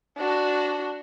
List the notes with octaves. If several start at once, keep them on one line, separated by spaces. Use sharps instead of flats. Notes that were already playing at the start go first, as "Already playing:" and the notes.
D4 F#4